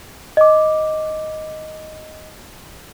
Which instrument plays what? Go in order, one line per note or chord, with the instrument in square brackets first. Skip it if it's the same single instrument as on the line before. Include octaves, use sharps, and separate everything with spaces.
[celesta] D#5 D6